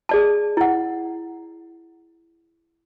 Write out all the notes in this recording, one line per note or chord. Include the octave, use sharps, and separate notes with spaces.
G#4 D5 A5
E4 F#5